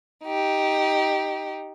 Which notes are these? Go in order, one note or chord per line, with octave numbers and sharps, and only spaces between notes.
D#4 G4